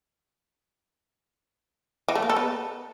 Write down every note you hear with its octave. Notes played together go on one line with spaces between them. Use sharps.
E3
A3
A#3
A4
B3